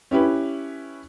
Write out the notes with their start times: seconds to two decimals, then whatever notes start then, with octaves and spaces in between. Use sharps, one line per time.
0.11 C#4 E4 G4 B4